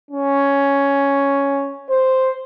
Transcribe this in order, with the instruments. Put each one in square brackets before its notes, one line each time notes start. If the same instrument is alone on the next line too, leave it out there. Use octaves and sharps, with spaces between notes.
[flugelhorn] C#4
C5